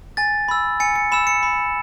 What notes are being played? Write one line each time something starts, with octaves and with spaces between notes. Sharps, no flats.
G#5 A6
B5 E6
G#5 C#7
C#7
B5 E6 E7
C#7
B5